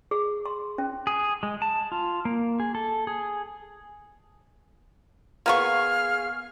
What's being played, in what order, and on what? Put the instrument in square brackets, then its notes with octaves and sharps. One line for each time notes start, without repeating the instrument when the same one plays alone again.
[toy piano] G#4
C6
C#4
[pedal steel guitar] G#4
G#3
A5
F4
A#3
G#4
A4
G#4
[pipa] A#3 B3 C#6 [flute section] G#4 F5 F6